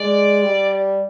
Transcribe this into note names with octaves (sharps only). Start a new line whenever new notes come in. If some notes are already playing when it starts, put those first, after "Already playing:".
Already playing: G#3 D5
G3